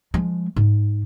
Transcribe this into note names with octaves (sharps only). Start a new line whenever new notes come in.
F3 G#3
G#2